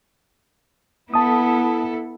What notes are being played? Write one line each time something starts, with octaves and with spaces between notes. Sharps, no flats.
B3 E4 A4 A5 D#6